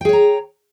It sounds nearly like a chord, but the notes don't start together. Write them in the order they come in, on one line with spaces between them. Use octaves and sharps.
G5 G#4 C#5 A#5